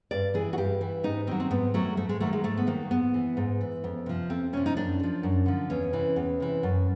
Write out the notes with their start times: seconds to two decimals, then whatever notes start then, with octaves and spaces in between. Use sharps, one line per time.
0.11 G2 D5
0.34 E3 G#4
0.53 F#4
0.58 G2 G4
0.81 E3
1.03 G#2 D#4
1.27 D#3 C4
1.31 F#3
1.40 C4
1.51 G#2 B3
1.74 D#3 F#3 A3
1.97 G#2 A3
2.09 G#3
2.20 D#3 F#3 A3
2.33 G#3
2.44 G#2 A3
2.57 B3
2.67 D#3 F#3 A#3
2.91 G#2 B3
3.14 E3
3.37 G#2
3.61 E3
3.84 F2
4.06 C3 F3
4.30 F2 C4
4.53 C3 F3 C#4
4.66 D#4
4.77 F#2 D4
4.99 D3
5.03 F3
5.23 F#2
5.46 D3 F3
5.70 E2 C#4
5.93 C3 E3
6.16 E2
6.40 C3 E3
6.63 F#2